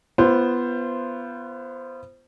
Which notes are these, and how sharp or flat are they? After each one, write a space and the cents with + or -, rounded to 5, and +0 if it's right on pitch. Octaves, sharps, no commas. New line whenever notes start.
B3 +0 F4 -35 C5 +0